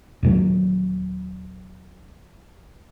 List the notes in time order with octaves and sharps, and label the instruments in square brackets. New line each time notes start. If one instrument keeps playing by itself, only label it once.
[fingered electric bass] D#2 A#2 F#3